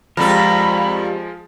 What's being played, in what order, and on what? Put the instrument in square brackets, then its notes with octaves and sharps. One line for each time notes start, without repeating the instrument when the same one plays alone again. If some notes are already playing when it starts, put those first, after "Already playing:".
[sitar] F2 G3 A4 [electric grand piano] F3 G#3 [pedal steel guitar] A#4 [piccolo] B5